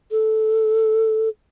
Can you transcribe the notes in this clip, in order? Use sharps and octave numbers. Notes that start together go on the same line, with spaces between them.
A4